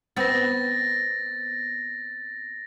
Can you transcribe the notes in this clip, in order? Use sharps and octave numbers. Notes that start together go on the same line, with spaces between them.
B3 C4 A6 A#6